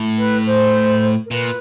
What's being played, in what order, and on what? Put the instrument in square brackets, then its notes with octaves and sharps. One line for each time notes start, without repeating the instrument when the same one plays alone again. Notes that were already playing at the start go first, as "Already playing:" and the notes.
Already playing: [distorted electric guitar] A2
[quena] B4
C5
A#4
[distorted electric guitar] A#2 [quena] B4